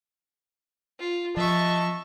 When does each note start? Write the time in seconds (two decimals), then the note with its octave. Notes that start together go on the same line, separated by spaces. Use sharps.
1.00 F4
1.37 F3 D#5 E5 A5 C#6